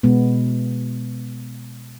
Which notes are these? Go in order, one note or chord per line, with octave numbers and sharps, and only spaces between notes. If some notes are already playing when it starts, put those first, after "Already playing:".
B2 G#3 B3